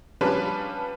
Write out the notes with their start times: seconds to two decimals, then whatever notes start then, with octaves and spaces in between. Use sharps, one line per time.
0.21 F3 G3 C#4 D4 B4